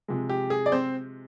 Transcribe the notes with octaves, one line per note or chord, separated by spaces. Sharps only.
C3 F3 G#3
G4
G#4
D5
C4 C5